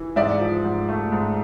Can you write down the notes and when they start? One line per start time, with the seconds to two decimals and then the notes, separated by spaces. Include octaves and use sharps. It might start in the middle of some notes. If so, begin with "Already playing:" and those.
Already playing: E3
0.16 G#2 D5 E5
0.40 F3
0.64 G#2
0.89 A3
1.12 G#2